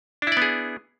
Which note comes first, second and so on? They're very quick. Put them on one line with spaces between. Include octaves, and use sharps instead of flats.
D4 E4 D5 B3 G#4